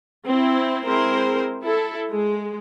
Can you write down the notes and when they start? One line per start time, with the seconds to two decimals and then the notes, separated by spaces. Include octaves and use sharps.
0.25 C4 E4
0.84 G#3 C4 E4 G#4 A#4 C5
1.64 E4 A4
2.11 G#3